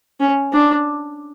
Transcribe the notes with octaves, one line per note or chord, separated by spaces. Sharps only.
C#4
D4